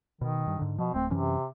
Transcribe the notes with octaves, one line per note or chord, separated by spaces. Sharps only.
B2 D#3
G2
G#2 D3
B2 F3
D1 A3 C4
F#2 C3 E3 C#4